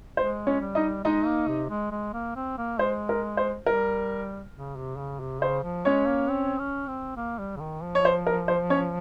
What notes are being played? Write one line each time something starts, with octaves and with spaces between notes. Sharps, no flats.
G#3 C5
C#4 C#5
G3
D#4 D#5
G#3 D#4 D#5
A#3
C3
G#3
G#3
A#3
C4
A#3
G#3 C5
A#4
C5
G3 A#4
C#3
C3
C#3
C3
C#3 C5
F3
G#3 C#4 C#5
A#3
C4
C#4
C4
A#3
G3
C#3
D#3
F3
C#5
C5
A#4
C5
C#4 C#5